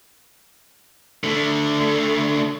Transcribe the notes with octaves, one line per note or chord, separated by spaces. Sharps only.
D3 A3